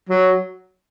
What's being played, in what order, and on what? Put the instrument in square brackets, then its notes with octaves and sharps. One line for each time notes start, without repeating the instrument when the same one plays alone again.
[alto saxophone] F#3